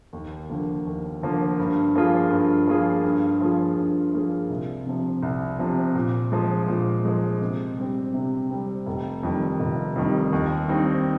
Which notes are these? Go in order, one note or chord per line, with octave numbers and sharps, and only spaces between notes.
D#2
D3 F3 A#3
D#2
D3 F3 A#3
G2
F3 A#3 F4 G#4
G2
F3 A#3 F4 G#4
G2
F3 A#3 F4 G#4
G2
F3 A#3 F4 G#4
C2
C3 F3
C2
C3 F3
A#2
F3 G#3
A#2
F3 G#3
C3
G3 C4
C3
G3 C4
F1
F2 D#3 G3
F1
F2 D#3 G3
D#2
D#3 G3 C4 D#4